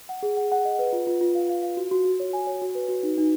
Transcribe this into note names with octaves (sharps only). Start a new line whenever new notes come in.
F#5
G#4
F#5
F#5
D#5
B4
F4
F4
F4
F5
F5
F5
F#4
F#4
F#4
C#5
G#5
C#5
F#4
B4
F#4
D#4
D#4